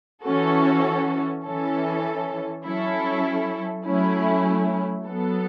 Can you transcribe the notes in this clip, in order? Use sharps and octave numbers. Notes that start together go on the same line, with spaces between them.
E3 C#4 F#4 A4
E3 C#4 A4
F#3 C#4 E4 A4
F#3 A3 C#4 E4
F#3 B3 A4